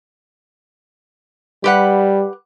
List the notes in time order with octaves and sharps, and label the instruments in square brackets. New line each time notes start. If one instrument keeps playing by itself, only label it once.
[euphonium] G3 [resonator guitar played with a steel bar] G4 B4 F#5